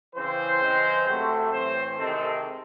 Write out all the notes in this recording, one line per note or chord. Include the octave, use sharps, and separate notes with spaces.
C#3 E3 C4 C5
C#3 E3 G#3 C4
C3 F#3 A3 C4
A2 E3 C4 C5
C3 D#3 G#3 C4 A4